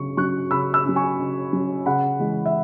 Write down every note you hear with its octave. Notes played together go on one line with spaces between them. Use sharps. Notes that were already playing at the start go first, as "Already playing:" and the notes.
Already playing: C#3 F#3 C#4 C#6
F#3 C#4 C#6 F#6
C#3 B5 E6
B5 E6
F#3 C#4
G#5 C#6
C#3
F#3 C#4
C#3 F#5 B5
E3 G#3
E5